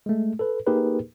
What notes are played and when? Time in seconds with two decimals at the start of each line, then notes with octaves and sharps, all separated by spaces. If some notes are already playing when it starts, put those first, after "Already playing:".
0.06 G#3 A3
0.39 A4 B4
0.67 A#3 D#4 G4 G#4 A#4 B4